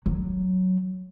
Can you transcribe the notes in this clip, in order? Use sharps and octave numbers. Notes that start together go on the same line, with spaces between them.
F#3